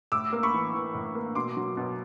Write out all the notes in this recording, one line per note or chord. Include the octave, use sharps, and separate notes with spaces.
A2 D6 E6
A#3
B5 C#6
E3
E3
A2
A#3
B2 C6 D6
F#3
B2